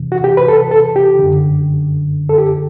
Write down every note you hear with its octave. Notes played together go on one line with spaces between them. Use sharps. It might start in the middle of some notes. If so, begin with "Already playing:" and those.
Already playing: E2 C3 E3
F#4
G4
B4
A4
A4
G4
F#2 D3
A4
G4